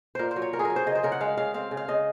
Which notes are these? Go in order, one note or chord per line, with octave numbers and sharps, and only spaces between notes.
A#2 A#4 C5
C5
F#3
C#5
C4 A#4
G#4
F#3 A#4
C5
C#3 D#5
C5
C#3 A#4
F#5
G#3 F5
C#3 F5
C4 F5
C#3
F5
C#3 D#5